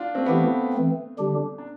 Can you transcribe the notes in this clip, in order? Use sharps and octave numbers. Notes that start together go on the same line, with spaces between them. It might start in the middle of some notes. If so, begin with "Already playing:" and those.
Already playing: D4 F4
A3 C4
E3 A3 B3 E4 G4
E3 A3 C4
D3 G3 D4 G4
D4